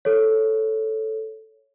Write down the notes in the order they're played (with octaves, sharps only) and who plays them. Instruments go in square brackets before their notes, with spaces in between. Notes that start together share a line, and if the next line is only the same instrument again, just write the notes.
[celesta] A4 C#5